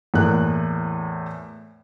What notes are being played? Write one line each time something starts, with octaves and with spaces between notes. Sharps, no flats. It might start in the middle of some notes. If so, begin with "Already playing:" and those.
E2 A2 A#3 F#6